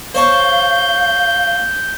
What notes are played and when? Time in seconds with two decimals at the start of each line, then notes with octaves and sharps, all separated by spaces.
0.15 C5 C#5 F5 A5 G6